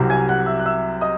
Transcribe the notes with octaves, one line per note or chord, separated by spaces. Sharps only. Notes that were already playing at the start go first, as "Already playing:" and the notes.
Already playing: C2 C3 F#3
G#5 G#6
F#5 F#6
E5 E6
F#6
E5 E6
D#5 D#6